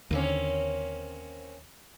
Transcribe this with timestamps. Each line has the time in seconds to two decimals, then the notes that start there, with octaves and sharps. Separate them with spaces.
0.11 D#2 D3 A#3 C4 C#4